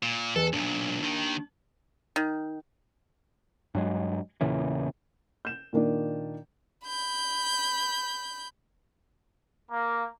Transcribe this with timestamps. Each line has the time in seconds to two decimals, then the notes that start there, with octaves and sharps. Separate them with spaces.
0.03 A#2
0.36 E2 A4 B4 D#5
0.53 B1 A#2 D4
1.02 D#2 D#3
2.16 D#3
3.75 G2 F#3 G#3
4.41 E2 A#2 C#3 E3
5.45 G6 E7
5.73 A#2 D#3 D4
6.87 B5 G6
9.71 A#3